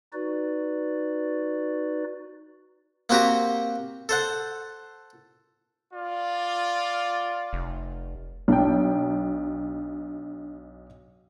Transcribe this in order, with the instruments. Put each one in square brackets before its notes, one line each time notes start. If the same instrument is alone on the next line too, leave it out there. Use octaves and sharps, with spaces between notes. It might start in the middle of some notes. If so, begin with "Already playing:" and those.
[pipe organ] D#4 F#4 B4 D5
[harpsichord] A#3 C4 F#4 G4 A#5
A4 C5 F#5
[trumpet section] F4 D5
[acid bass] F1
[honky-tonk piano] B1 G5 [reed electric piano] D4